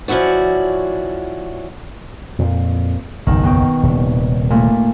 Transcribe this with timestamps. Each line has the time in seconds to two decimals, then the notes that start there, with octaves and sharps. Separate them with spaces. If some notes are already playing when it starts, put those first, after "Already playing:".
0.08 F3 C#4 E4 F#4 D5
2.39 F2 A#2
3.27 F#1 B1 E2 D#3
3.43 B2 G5
3.83 D#1 C3
4.50 A#2 A3